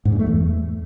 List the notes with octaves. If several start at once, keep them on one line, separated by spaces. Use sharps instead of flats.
G#2
G2
A3
E2